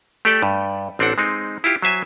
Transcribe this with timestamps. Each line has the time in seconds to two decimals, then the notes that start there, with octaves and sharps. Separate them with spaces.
0.25 A3 G4 A4 D5 G5
0.42 G2
0.99 A1 C4 D4 A4 F#5
1.18 G#3 C4 D#4
1.64 E4 F4 G4
1.82 F#3 C5 E5 G#5